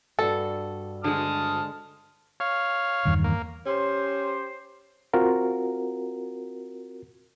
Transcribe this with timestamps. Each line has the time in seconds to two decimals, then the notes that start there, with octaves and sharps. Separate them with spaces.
0.19 G2 F#4 A4
1.04 D3 G#3 A5 D#6 F6
2.40 C#5 F5
3.05 E2 G2 D#3
3.24 A#3
3.66 C#4 G4 C5
5.13 C4 F4 F#4 A#4